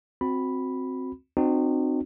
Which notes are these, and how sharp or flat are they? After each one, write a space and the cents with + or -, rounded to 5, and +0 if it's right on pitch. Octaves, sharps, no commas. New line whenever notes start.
C4 +0 F#4 -20 B5 +0
C4 -5 D#4 -40 F#4 -10